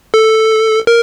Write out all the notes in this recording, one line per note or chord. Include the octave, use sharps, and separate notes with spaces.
A4
A#4